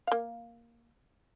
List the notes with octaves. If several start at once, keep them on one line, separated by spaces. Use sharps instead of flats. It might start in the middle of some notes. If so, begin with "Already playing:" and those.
A#3 F5